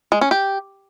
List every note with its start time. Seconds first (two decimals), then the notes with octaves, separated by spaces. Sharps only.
0.12 G#3
0.21 C#4
0.31 G4